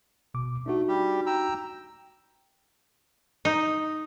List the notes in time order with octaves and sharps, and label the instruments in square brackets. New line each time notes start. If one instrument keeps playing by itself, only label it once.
[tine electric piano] G#1 B2 D6
[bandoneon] A3 [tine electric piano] D4 D#4 F#4
[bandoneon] G3 G4
G5 A#5 E6
[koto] D#4